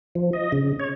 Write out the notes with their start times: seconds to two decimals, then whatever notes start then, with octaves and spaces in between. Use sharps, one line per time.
0.15 F3
0.33 D#5
0.52 C#3
0.80 C#5